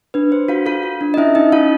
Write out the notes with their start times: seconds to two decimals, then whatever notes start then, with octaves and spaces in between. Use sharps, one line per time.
0.14 D4 B4
0.31 D4 C5
0.48 F4 F#4 F5
0.66 F4 A4 F5
0.83 A4
1.01 D4
1.14 D#5
1.17 C#4 E4 E5
1.35 C#4 D#4 D#5
1.52 C#4 F4 F5